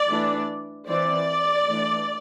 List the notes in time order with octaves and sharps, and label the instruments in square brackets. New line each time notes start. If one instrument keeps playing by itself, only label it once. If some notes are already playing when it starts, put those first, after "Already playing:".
Already playing: [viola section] D5
E3 A3 D4
E3 C4 D5
E3 A3 D4